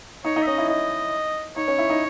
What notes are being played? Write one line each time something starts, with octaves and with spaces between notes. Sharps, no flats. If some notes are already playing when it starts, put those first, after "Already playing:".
D#4 C#5
D#4
E5
C#4 D#5
E4
D#4 D#5
D#4 C#5
C#4
E4
D#4